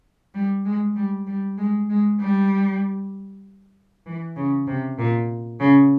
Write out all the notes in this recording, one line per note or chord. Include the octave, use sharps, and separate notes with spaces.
G3
G#3
G3
G3
G#3
G#3
G3
E3
C#3
C3
A#2
C#3